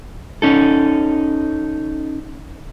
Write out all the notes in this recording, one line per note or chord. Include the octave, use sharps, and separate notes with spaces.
C#4 D#4 A4